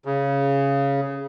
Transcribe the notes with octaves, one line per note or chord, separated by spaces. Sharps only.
C#3